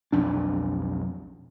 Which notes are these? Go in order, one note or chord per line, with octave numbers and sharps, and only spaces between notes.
B1 F2 D4